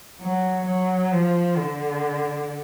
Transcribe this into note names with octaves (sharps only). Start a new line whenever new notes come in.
F#3
F#3
F3
D3